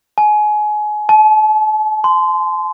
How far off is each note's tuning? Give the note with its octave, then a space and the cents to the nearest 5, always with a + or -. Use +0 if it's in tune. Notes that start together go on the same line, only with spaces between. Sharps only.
G#5 +25
A5 -40
C6 -20